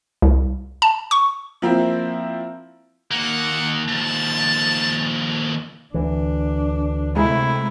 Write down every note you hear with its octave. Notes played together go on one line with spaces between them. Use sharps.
C2
A5
C#6
F3 A#3 C4 E4
D#2 A#3 F#5
D#2 F3 A5
D2 E3 D4
C3 G#3 A3 E4